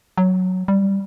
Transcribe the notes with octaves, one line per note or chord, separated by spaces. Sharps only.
F#3
G3